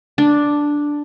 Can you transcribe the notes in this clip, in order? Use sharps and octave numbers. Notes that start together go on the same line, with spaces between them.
D4